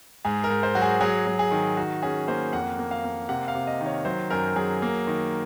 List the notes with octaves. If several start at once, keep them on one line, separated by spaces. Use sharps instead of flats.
G#2 G#4
A#4
G#2
C5
F#3 F#4
G#4
F#3 G#4
F#3
G#4
D#3
D#3 F#4
C#4 G#4
A#3 C5
F2 F#5
A#3
F5
A#3
C3 F#5
F5
C3
D#5
D#3
C#5
F#3 C5
F#2 A#4
F#3 G#4
A#3
D#3